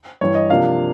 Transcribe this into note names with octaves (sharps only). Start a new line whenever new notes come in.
G2 E3 G3 C#5
D#5
C3 F3 A#3 D4 F5